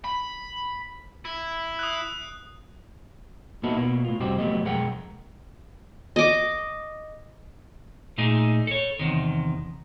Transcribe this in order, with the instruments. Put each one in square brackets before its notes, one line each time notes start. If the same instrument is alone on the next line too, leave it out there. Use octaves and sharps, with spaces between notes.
[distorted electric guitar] B5
E4
[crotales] D#6 F#6
[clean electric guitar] A#3 B3 D#4 E4 F#4 A4
B2 A#3 B3
A2 F4
F2 C3 G3 C4 F#4 G4
F3 F#3 A3 B3 G4 D#5
B1 F2 G#3 A#4 F#5 G5
[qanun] D#5 D6
[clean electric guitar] A#2 A3 D#4 G#4
A4 C#5
E2 A2 C3 D#3